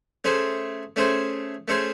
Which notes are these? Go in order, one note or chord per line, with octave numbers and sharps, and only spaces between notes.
A3 C#4 G#4 C5
A3 C#4 G#4 C5
A3 C#4 G#4 C5